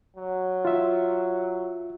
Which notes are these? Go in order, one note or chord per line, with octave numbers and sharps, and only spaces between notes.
F#3
F4 E5